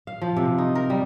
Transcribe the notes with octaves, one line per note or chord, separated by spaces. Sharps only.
F5
F3
C3
D#4
A#4
G3